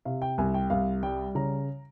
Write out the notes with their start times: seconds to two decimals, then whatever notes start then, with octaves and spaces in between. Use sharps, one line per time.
0.05 C3 F5
0.22 G5
0.38 C2 G#5
0.54 G5
0.70 C2 F5
1.03 G3 G5
1.35 C#3 A#5